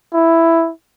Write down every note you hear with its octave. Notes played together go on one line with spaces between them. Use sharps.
E4